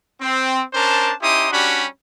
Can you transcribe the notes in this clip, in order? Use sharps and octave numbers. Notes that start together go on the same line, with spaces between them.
C4
C#4 D4 A#4 C5 A5
C#4 D#4 E4 G4 C6 D#6
G3 C#4 D4 F#4 G4 B5